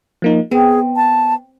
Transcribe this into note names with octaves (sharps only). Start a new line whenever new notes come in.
F3 A#3 D#4
B3 C4 G#4
A5